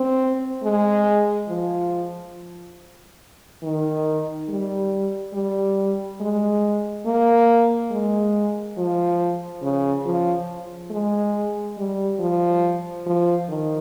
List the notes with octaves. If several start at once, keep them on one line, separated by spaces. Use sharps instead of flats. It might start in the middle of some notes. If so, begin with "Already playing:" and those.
Already playing: C4
G#3
F3
D#3
G3
G3
G#3
A#3
G#3
F3
C#3
F3
G#3
G3
F3
F3
D#3